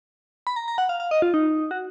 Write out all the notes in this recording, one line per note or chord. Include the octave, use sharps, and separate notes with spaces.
B5
A#5
A#5
F#5
F5
F5
D#5
F4
D#4
F#4